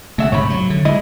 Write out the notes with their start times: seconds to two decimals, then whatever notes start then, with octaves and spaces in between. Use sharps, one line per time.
0.18 C#3 A3 E5 F#5
0.32 G#2 C3 C#5 B5
0.50 F#3
0.70 D3
0.85 G#3 E4 D#5